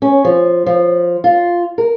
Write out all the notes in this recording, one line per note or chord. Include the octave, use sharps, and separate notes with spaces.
C#4
F3
F3
F4
A#4